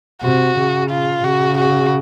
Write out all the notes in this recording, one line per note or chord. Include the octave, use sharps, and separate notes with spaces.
C3 F#4
C#3
F4
C#3 F#4
F#4